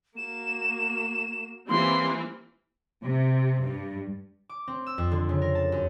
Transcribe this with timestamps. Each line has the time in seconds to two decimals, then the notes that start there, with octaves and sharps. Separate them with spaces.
0.17 A#3 F#4 E7
1.69 E3 G3 A#3 C4 C#4 C6
3.03 C3
3.61 G2
4.49 D6
4.68 C4
4.86 E6
4.98 F2
5.11 D3
5.29 C#3
5.42 A#4
5.55 A5
5.72 F#2